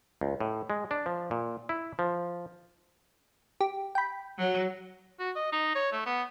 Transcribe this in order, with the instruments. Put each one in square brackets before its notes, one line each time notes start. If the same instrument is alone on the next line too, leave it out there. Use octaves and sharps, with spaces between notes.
[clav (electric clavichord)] C#2
A2
G#3
D4
F3
A#2
E4
F3
[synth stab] G4
G5 B5
[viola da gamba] F#3
[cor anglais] F#4
D#5
D#4
C#5
A3
B3